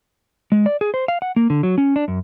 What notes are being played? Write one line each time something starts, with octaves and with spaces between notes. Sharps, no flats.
G#3
D5
G#4
C5
F5
F#5
A#3
D3
F#3
C#4
D4
F#2